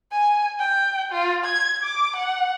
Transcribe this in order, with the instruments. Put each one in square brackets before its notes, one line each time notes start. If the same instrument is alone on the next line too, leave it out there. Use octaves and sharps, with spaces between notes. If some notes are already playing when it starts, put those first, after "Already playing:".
[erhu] G#5
G5
F4
G#6
D6
F#5